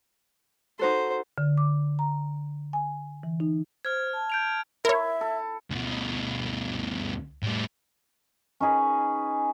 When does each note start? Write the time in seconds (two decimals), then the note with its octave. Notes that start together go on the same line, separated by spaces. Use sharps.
0.79 D#4 F#4 A4 C5
1.38 D3
1.58 D6
1.99 A#5
2.73 G#5
3.23 E3
3.40 D#4
3.85 C5 F6 G#6
4.13 A5
4.30 G6 D7 F7
4.85 E4 A#4 C#5 E5
5.21 A4
5.70 D2 B2
7.43 A2 G3
8.60 C#4 D#4 G#4 B4